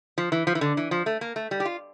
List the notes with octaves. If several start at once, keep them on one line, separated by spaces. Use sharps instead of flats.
F3
E3
F3
E3
D3
E3
F3
A3
A#3
A3
G3
G4
F4